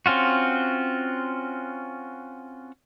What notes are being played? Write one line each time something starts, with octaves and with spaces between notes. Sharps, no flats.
C4 C#4 F4 F#4